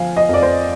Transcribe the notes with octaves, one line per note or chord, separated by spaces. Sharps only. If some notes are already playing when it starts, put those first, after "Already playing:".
Already playing: D3 F3 F5 G#5
D#5
F2 D5
C5